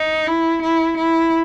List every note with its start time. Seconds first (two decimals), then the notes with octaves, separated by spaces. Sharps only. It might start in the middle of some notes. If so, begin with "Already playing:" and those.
Already playing: D#4
0.27 E4
0.62 E4
0.97 E4